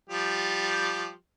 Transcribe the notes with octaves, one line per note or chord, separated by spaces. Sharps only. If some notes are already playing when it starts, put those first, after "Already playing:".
F3 G3 G4